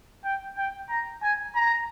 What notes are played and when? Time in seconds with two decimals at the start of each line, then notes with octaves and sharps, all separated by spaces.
0.25 G5
0.58 G5
0.90 A#5
1.23 G#5
1.55 A#5